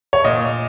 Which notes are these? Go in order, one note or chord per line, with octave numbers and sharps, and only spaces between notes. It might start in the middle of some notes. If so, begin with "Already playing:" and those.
C#5
A#2 D#5